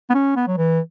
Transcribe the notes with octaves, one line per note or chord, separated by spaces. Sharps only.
B3
C#4
B3
F#3
E3